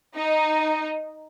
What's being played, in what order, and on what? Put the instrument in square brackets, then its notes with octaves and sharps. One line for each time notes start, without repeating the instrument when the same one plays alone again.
[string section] D#4